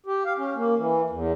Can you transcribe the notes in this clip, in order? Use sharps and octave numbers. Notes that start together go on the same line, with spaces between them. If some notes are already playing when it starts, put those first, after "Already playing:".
G4
F5
C#4
A#3
E3
E2